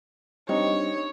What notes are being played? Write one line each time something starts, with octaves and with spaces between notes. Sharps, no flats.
G3 C4 D4 D#4 C#5